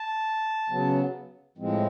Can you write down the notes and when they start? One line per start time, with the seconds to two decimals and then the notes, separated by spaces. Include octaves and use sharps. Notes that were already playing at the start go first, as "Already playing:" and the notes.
Already playing: A5
0.70 C#3 F#3 B3
1.58 A2 F3 G#3 C4